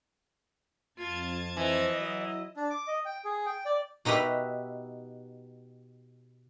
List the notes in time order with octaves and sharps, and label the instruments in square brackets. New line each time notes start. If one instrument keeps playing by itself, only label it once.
[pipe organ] F2 A5 G#6 [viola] F4
[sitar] E3 [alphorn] C5 [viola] D#5
[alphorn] F#3
[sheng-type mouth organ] D4
D6
D#5
G5
G#4
G5
D5
[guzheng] B2 D#4 G4 B4 E5